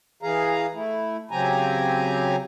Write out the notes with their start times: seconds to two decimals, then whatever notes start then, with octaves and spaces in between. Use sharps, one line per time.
0.23 E3 G#4 F5 A#5
0.74 A3 E4
1.31 C#3 F#3 C4 G4 G#5 A#5